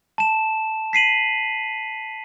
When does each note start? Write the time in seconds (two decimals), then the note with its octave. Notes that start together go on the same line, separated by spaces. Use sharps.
0.18 A5 E7
0.93 B6 C7 D#7 F#7